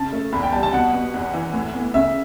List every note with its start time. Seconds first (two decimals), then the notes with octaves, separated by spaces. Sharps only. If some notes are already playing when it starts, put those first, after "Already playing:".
Already playing: C#3 A5
0.12 A3
0.33 E2 B5
0.43 G5
0.52 G3 A5
0.63 A5
0.73 B2 F#5
0.93 B3
1.14 E2
1.33 E3
1.53 A2
1.74 B3
1.94 C#3 E5